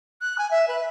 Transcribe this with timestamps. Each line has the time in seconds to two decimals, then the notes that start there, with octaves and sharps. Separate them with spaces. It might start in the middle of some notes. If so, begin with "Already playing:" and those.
0.21 F#6
0.38 G#5
0.51 E5
0.68 B4